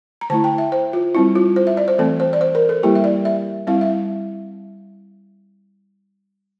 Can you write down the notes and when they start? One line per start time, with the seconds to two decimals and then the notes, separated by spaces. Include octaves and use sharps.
0.21 A#5
0.30 D3 A3 E4 A5
0.44 G5
0.58 E5
0.72 C5
0.93 F4
1.15 G3 C4 E4
1.35 F4
1.56 C5
1.67 E5
1.77 D5
1.88 C5
1.98 E3 A3 C4 A4
2.20 C5
2.33 D5
2.41 C5
2.55 A#4
2.69 A4
2.83 G3 A#3 E4 G4
2.95 E5
3.04 D5
3.25 E5
3.67 G3 C4 E4 F5
3.81 E5